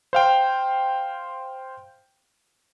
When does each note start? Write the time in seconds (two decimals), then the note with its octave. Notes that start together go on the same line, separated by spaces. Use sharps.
0.13 C5 F5 G5